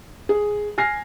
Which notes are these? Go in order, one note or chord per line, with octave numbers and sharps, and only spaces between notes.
G#4
G#5 F6 A#6 C7